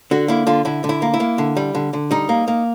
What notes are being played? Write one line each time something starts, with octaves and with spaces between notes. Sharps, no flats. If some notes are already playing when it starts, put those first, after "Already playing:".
D3 F#4
A#3 E4
D3 F4
D3 E4
D3
E4
A#3
E4
A#3
D3
G3
D3
D3
G3 D#4
A#3
A#3